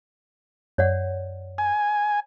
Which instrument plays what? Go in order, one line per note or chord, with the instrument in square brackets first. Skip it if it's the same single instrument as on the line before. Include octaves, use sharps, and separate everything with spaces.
[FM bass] F#2 [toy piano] C#5 D5 F#5
[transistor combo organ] G#5